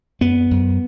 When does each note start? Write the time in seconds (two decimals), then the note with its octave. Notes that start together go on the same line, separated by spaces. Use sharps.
0.21 F#2 B3
0.51 F#2